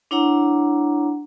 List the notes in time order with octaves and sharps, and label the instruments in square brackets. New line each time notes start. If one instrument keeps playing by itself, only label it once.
[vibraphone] D4 E4 C#5 F#5 A#5